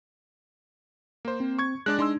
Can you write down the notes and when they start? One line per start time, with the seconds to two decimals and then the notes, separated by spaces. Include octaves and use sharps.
1.25 A#3 C5
1.40 C4
1.59 C#6 G#6
1.86 G#3 D4 D5 F#6
1.99 G#3 D4 D#4 C6 E6